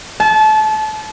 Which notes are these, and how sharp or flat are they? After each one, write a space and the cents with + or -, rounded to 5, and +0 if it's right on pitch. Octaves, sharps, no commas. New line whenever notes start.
A5 -30